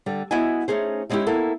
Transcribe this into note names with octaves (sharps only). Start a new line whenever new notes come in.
D3 G3
B3 E4 F#4 D#5 E5 G#5
A3 C#4 D#4 G#4 C5
G3 G#3 C#4 D#4 E4 G4
A#3 B3 E4 A4